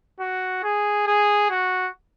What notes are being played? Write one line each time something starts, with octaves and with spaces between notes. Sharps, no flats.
F#4
G#4
G#4
F#4